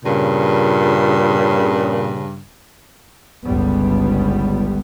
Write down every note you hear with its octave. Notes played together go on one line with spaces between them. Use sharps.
G2 A#2 C#3
G1 C#2 G3 B3